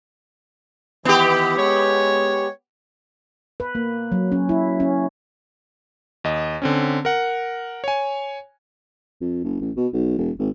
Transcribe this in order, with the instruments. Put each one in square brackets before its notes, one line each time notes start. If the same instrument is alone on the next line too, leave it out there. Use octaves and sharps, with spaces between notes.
[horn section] D#3 E3 [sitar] B3 G4
[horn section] G#3 C#5
[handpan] B4
A#3
F#3
C#4
E4
C#4
[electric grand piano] D#2 D#5
D3 C4 C#4
A#4 F#5
C#5 G#5
[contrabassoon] F2
F#1
A1
B2
B1
E1
G#1